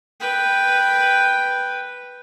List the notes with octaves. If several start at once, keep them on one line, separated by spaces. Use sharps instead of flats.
B4 G5